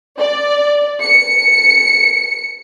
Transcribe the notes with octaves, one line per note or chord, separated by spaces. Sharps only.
D5
C#7